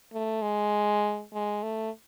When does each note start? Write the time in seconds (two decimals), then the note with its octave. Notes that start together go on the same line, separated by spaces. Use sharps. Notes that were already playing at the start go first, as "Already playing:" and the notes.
0.13 A3
0.42 G#3
1.34 G#3
1.63 A3